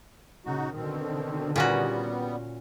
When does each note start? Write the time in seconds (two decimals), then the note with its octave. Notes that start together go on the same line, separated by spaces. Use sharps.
0.46 A#2 C#3 D#4 F#4
0.76 B2 D3 D#3 C4
1.56 A#2 G3 B3 C#4 F#4